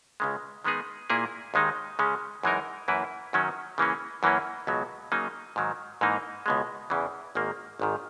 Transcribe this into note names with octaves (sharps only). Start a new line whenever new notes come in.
C#2 C#3 G#3
D#3 G#3 B3 D#4 G#4
A#2 A#3 E4 G#4
D#2 D#3 G#3 D#4
C#3 G#3 C#4
F#2 E3 G#3 D#4 A#4
F#2 E3 A#3 E4 B4
F#2 D#3 F#3 C#4
C#3 E3 A#3 C#4
F#2 E3 A#3 C#4
C#2 B2 F#3
C#3 F#3 A#3 D#4
G#2 D#3 F#3
G#2 E3 A#3 D#4
C#2 B2 G#3
E2 C#3 E3
G#1 G#2 D#3 A#3
G#1 G#2 D#3